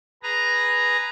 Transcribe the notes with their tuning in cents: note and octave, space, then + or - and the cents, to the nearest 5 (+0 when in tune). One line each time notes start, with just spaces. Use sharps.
G#4 +0 B4 +0 A#5 +0